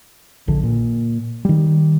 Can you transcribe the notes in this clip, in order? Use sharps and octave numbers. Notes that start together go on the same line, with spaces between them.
A#1 D3
A#2
D#3 G3